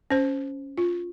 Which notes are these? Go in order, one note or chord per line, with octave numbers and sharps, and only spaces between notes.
C#4 C5
F4